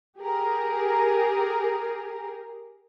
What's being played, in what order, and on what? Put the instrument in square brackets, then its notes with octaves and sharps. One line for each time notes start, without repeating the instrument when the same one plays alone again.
[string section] G4 G#4 A#4